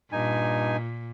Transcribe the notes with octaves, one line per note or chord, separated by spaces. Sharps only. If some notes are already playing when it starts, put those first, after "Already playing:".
G2 A#2 D#4 G#5